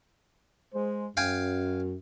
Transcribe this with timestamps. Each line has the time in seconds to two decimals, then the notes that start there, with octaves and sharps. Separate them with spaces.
0.74 G#3 C5
1.17 F#2 F5 G5 G#5